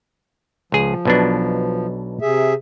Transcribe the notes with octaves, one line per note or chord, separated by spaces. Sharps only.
C#2 F3 G#4
B1 B2 D4
C3 G#4 E5